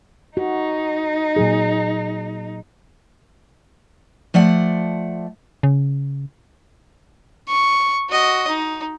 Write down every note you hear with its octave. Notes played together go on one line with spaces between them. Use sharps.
D#4 F#4
A#2 F#3 G#4
F3 A3 D5 F#5
C#3
C#6
F#4 D#5
D#4